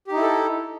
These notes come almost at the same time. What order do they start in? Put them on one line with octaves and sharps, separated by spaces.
G4 D#4 E4 A4